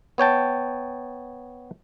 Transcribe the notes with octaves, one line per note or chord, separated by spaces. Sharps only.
B3 C#5 G5 A5